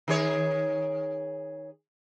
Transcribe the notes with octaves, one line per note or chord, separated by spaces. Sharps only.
D#3 G#4 C#5